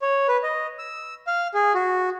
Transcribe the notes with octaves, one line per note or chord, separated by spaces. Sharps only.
C#5
B4
D#5
E6
F5
G#4
F#4